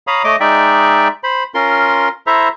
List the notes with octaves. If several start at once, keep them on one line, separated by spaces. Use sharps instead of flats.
C#5 F5 A#5 B5 D#6
A3 C#5 D#5 D6
G#3 D#4 D5 E5 G5
C5 B5
C#4 F4 A#4 C6
E4 A4 C5 E5 A#5